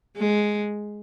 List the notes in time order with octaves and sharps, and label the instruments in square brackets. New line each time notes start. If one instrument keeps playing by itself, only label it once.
[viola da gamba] G#3